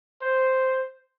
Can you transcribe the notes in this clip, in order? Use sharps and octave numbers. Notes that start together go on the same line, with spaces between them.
C5